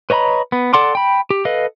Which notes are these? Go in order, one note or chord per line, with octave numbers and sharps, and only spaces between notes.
B4 C#5 D#5 A#5 B5
B3
A4 D5 F#5 C6 D6
G5 B5
G4
A4 B4 D#5 F5